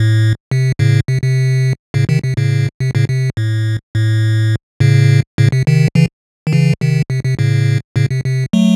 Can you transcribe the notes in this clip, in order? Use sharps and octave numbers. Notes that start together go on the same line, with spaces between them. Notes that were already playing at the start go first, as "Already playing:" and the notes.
Already playing: A2
C3
A2 C#3
C3
C3
A2 C#3
C3 D#3
C3
A2 C#3
C3
A2 C#3
C3
A2
A2
A2 C#3
A2 C#3
C3
C3 D#3
C#3 E3
D#3
C#3 E3
C3 D#3
C3
C3
A2 C#3
A2 C#3
C3
C3
F#3 A3